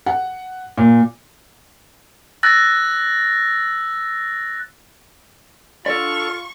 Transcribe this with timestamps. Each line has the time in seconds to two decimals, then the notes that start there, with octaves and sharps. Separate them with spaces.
0.06 F#5
0.78 A#2
2.43 E6 F#6 A6 A#6
5.86 F4 A4 D5 C#6